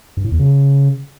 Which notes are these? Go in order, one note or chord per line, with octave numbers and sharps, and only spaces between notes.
G2
A2
E2
C#3